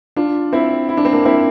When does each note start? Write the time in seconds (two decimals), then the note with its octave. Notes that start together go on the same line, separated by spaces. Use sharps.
0.16 D4 F4
0.53 C4 E4
0.89 E4
0.97 D4
1.05 C4
1.13 A#3 D4
1.25 C4 E4